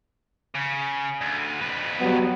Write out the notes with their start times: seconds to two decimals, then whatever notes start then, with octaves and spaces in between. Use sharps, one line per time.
0.55 C#3
1.21 D2
1.61 F2 B4
2.00 F#3 G3 B3